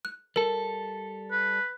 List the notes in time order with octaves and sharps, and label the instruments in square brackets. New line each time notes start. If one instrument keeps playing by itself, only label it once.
[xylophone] F#6
[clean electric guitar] G3 A4 [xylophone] A#4
[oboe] B4